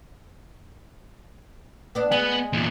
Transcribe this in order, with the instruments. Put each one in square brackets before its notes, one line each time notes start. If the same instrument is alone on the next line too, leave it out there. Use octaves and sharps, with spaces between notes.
[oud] B3 D4
[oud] G#3 [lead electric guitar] B3
[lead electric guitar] E2 A#2